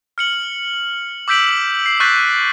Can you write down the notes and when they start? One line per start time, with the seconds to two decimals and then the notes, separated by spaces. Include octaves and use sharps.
0.18 F6 C#7 F#7
1.28 D6 E6 G6 B6 D7 F#7
1.86 C7
2.00 C#6 F#6 G6 A6 B6 C7